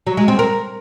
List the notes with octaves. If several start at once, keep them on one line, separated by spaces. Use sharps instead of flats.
F#3
G#3
C4
A#4